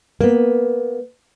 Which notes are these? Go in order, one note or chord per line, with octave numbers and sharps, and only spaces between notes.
A#3 B3